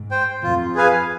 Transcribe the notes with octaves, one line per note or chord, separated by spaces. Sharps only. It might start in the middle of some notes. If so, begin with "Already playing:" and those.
Already playing: G#2
C5 G5
F2 F4
G#4 B4 F5 G#5